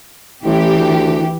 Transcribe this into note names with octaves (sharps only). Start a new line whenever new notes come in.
A1 E3 G4
D2